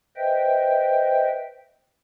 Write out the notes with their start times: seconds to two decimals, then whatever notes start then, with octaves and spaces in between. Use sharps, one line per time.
0.17 B4 C5 D#5 E5 G5